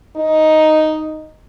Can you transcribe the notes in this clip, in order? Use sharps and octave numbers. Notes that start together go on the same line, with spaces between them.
D#4